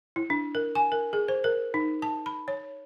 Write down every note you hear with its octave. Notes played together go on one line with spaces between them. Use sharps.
E4
D4
A#4
G#5
A#4
G#4
C5
A#4
D#4
A5
B5
C#5